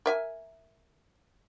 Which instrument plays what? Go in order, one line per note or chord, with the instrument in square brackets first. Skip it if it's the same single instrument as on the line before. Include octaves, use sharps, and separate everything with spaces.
[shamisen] A#4 E5 G#5